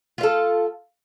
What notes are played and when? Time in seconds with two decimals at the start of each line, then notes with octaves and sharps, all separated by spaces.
0.18 F4
0.21 F5
0.23 A4